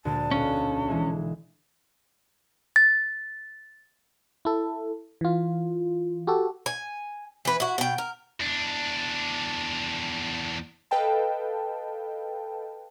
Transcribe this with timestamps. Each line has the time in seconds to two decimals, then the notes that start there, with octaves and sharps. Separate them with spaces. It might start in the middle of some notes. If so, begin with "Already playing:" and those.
0.05 D2 A#2 G#3 A5
0.31 B1 C#4 D4 F5
0.88 E3 G#3 E5
2.76 A6
4.45 E4 A4
5.21 E3 F4
6.27 F#4 G4 A4
6.66 G#5
7.45 E3 B4
7.60 E4 F#4
7.78 B2 G5
7.98 A#4
8.40 E2 D4
10.91 A4 B4 D#5 F5 G5 A5